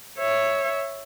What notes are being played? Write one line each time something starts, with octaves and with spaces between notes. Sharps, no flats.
C#5 E5